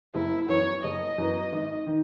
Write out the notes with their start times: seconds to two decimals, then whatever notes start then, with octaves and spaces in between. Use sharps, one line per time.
0.14 F#1 E4
0.48 F#2 E3 B3 C#5
0.83 F#1 D#5
1.18 F#2 E3 B3
1.52 G#1
1.87 D#3